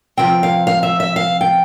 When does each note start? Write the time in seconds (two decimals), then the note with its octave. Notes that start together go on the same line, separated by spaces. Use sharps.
0.17 C3 F3 C4 G5
0.43 F5
0.67 F5
0.83 E5
1.00 E5
1.16 F5
1.41 G5